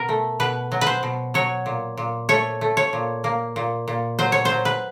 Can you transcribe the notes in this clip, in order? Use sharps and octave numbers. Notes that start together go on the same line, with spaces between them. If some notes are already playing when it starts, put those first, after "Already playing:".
Already playing: B2 A#4
A3
B2 B4
F#3
B4
C5
B2
F#3 C#5
A#2
A#2
A3 C#5
A3
C#5
A#2
A#3
A#2
A#2
F#3 C5
C#5
F#3 C5
B4